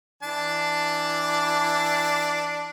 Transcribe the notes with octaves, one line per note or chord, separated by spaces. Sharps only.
E3 D4 A5